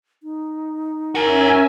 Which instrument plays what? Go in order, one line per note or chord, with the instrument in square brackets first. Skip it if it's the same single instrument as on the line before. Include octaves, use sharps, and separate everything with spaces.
[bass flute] D#4
[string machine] C#4 E5 G#5 [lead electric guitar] F#4 G#4 [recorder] A#4